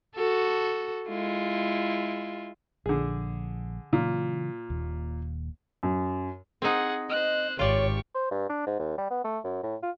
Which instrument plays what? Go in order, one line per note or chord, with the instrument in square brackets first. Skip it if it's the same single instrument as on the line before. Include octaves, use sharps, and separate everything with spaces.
[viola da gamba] F#4 A4
G#3 E4 F4
[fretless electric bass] A#1 [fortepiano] D3 G#4
[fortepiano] A#2 [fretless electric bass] C#3 E3 F#3
[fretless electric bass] D#1 D#2
[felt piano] F#2
[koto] C4 D#4 [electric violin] G#4 F#5
[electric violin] C5 F#6 [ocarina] D#5
[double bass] G#1 [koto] F4 D5 [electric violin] G4 C#6 [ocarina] C#5
[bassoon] C5
G2
D4
G#2
D#2
G3
B3
A3
F#2
A2
F4